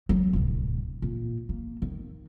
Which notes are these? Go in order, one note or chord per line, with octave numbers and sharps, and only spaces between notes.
F#3 G#3
D1 C2
A#2
A#3
D#3